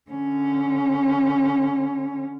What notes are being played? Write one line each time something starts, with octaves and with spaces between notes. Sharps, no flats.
D3 C#4